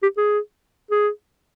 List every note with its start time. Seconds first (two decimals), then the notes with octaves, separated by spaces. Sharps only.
0.02 G4
0.17 G#4
0.91 G#4